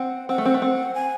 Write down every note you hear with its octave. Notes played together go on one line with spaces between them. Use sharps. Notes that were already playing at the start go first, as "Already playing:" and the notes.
Already playing: C4 F#5
C4 F#5
A3
C4
A3
C4
G#5